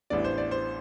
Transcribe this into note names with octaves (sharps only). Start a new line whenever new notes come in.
A1 A2 G3 B3 D4 D5
C5
D5
C5